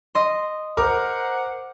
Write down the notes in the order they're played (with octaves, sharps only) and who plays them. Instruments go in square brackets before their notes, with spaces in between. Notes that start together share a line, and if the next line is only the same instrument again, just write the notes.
[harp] D#5 C6
[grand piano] A#4 D6 F6 [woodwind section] C5 F#5